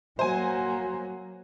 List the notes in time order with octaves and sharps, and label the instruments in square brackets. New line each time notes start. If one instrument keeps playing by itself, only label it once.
[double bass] F#3 A#3 [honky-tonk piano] C5 G#5